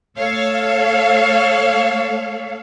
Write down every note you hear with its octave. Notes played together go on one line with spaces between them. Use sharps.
A3 A4 C#5 F5